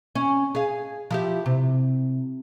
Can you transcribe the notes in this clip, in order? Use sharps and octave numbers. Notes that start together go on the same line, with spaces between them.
C#4
G#4 F5
F3 E4 G4
C3